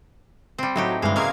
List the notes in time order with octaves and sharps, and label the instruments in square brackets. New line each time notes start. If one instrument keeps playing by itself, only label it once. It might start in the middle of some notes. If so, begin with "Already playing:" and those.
[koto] G3 C4
[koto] A2 D#4 G4 [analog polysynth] F#3
[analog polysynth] G2 D3 G#3 [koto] E3 F5
[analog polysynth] C#3 F5 G#6 [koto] F#3 G#3 A#3